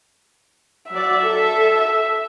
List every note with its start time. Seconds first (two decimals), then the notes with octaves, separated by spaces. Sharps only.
0.92 F#3 F#4 D5 E5
1.24 A4